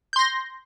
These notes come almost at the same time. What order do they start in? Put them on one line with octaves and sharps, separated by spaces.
G6 C6 A#6